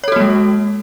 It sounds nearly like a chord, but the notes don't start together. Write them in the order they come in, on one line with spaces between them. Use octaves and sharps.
C#5 A4 F#4 A#3 G#3